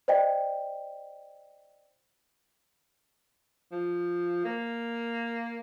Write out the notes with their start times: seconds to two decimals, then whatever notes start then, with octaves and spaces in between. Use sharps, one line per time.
0.08 C5 D5 D#5 G5
3.72 F3
4.45 A#3